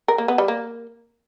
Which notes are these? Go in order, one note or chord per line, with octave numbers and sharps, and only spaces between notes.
A#4
A#3
B3
G3
A#3